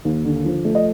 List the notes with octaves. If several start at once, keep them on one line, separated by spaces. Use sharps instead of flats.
D#2
D3
F3
A3
D#5